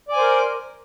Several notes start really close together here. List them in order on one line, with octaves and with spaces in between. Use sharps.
D5 G#5 C5 A#4